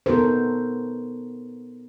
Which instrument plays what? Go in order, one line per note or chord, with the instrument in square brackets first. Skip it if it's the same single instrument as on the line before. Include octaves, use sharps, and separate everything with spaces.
[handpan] B3 D#4 F#4 A4 A#4 C5